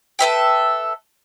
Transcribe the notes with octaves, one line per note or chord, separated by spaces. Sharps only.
A4 B4 E5 G5